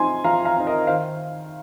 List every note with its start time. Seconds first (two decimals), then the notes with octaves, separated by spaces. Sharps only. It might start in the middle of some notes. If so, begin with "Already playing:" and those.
Already playing: F3 C4 D#4 G#5 C6
0.24 F3 F5 A#5
0.45 F5 A#5
0.56 C4 D#4
0.67 A#4 D#5
0.87 D#3 C5 F5